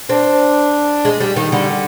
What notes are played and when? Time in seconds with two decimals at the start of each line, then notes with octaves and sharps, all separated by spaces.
0.09 C4 D4
1.05 G#3
1.20 G3
1.36 D#3
1.52 D3 G3